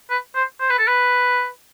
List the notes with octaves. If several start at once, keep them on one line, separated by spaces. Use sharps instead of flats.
B4
C5
C5
B4
A4
B4